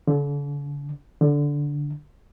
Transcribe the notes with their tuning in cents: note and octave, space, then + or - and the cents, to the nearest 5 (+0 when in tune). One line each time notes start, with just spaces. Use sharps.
D3 -40
D3 -10